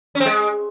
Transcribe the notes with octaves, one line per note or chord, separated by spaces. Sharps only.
C#4
C4
G#3